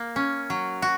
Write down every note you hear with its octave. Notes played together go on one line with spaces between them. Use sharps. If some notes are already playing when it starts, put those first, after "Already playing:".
Already playing: A#3
C#4
F#3
F#4